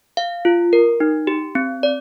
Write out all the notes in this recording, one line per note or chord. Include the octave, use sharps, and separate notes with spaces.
F5
F4
A#4
D#4
G4
C4
D5